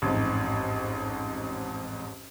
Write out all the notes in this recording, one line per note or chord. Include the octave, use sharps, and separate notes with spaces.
A1 F2 G#2